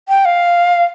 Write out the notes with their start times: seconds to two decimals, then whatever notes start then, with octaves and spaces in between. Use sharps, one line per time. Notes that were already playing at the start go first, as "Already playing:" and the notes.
0.09 G5
0.25 F5